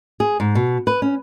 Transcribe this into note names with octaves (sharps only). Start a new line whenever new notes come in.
G#4
G#2
B2
B4
C#4